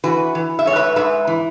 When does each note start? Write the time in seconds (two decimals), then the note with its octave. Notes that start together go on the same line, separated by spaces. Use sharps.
0.04 E3 F#4 B4
0.35 E3
0.59 E5
0.65 G#2 C#5
0.76 B4 E5
0.96 G#2 B4 E5
1.27 E3